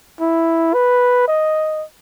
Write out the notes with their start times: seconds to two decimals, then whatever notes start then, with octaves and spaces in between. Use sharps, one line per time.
0.20 E4
0.74 B4
1.28 D#5